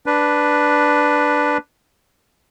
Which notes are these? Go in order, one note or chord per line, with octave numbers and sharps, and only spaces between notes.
D4 B4